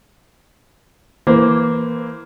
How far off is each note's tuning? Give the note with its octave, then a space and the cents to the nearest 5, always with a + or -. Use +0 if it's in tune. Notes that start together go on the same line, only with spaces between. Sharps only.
E3 +0 A#3 +0 C5 -20